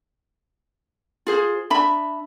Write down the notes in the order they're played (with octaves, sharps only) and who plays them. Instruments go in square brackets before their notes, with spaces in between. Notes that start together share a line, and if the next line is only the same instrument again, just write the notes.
[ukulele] F4 G#4 C5
D4 E5 B5